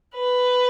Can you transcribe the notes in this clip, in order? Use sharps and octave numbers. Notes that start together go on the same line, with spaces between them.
B4